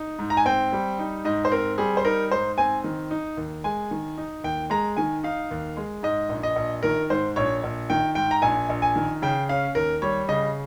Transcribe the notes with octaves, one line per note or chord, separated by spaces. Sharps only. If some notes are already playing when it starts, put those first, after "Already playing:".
Already playing: D#4
G#2
A#5
G#5
C4 G5
G3
D#4
G#2 D#5
C5
C4 A#4
G3 G#4
C5
D#4 A#4
G#2 C5
C4 G#5
D#3
D#4
D#2
G#3 G#5
D#3
D#4
D#2 G5
G#3 A#5
D#3 G#5
D#4 F5
D#2
G#3
G#2 D#5
A#1
D#5
A#1
D#3 A#4
G#2 C5
A#1 C#5
A#1
D#3 G5
G#2 G5
A#5
A#1 G#5
A#1
G#5
D#3
C#3 G5
C#4 F5
D#2 A#4
G3 C#5
C#3 D#5